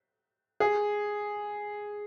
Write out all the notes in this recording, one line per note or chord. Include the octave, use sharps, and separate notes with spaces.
G#4